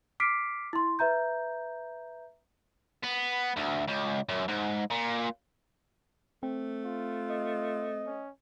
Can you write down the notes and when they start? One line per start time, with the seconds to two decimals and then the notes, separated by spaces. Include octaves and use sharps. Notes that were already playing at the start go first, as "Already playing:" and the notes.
0.20 D6 F6 B6 C7 D7
0.73 E4 C6
0.99 B4 E5 A#5 G6
3.03 B3
3.56 D2
3.88 C#2
4.29 F#2
4.48 G#2
4.91 A#2
6.43 A3 C4
6.85 F4
7.30 D#5
8.06 C#4